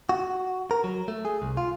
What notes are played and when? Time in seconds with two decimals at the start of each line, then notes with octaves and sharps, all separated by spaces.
0.09 F#4
0.71 A#4
0.84 F#3
1.08 A3
1.25 G#4
1.42 C2
1.57 F4